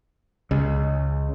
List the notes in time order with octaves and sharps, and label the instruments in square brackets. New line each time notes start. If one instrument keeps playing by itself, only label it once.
[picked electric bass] C#2 [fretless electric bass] C#3 G#3